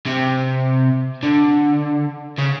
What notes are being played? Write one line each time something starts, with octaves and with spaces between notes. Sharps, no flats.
C3
D3
C#3